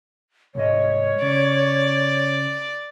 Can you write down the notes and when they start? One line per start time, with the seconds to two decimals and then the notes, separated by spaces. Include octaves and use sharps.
0.55 C2 G#2 C#5 D#5
1.22 C#3 D5